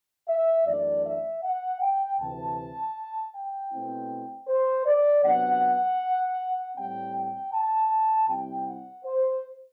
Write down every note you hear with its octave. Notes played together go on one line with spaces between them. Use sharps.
E5
F#2 E3 A3 D4 D5
E5
F#5
G5
D2 C3 E3 A5
G5
B2 A3 C4 E4
C5
D5
C3 F#3 B3 D4 F#5
A2 G3 C4 G5
G5
A5
C3 G3 C4 E4 G5
F#5
C5